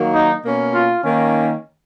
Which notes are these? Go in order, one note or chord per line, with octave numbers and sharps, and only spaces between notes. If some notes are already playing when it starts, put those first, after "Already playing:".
Already playing: D#3 F#3 A#3
D#4
B2 A#3 C#4
F4
D#3 A#3 C#4